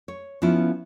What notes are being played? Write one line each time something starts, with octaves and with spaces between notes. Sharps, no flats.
C#5
F3 B3 C#4 E4 F4